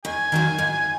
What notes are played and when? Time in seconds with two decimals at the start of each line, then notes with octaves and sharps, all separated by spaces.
0.05 D#2 G#5
0.32 D#3 F#3 A#3 F4
0.58 G#2